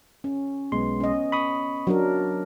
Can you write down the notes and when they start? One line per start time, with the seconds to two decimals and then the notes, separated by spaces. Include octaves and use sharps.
0.24 C#4
0.72 B1 G#3 B3 C6
1.00 C#4 D#5
1.32 B5 C#6 D#6
1.87 F#3 D4 F#4 A#4